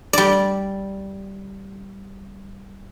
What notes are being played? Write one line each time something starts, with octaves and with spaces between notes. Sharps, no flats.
G3 D5